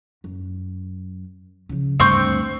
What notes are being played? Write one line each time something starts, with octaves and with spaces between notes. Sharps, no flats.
F#2
C#3 F3
D2 G2 C4 C#6 G6